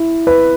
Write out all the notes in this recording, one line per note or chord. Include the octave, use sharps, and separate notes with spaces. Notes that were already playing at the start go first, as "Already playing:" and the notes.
Already playing: E4
B4